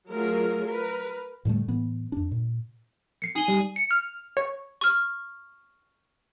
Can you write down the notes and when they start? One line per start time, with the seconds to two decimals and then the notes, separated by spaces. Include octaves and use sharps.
0.10 F#3 A3 F4 G#4 A#4
0.66 A#4 B4
1.45 A2 D3 G3 A3
1.68 A2 E3 B3
2.12 F2 D4
2.31 A#2
3.22 C7 C#7
3.36 D#4 G#4 G7
3.48 G3
3.76 C#7
3.91 F6
4.37 C#5
4.81 C#6 F6